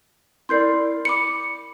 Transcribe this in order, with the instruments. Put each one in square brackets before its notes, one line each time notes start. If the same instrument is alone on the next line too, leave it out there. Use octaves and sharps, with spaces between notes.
[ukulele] E4 A#4 D5 [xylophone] C6 G6 C7
[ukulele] B5 [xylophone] D6 C#7